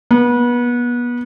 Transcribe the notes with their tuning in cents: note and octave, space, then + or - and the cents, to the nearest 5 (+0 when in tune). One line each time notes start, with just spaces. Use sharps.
B3 -30